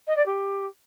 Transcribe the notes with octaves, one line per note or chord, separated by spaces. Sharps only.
D#5
D5
G4